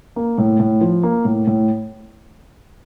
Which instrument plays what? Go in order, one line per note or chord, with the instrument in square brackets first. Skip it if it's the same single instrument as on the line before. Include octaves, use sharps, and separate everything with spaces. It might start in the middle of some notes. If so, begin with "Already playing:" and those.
[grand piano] A#3
A2
A2
F3
A#3
A2
A2